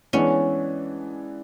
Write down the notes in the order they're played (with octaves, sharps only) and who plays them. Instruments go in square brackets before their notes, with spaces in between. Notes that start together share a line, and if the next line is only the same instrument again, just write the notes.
[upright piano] E3 G#3 B3 D4 [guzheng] C#4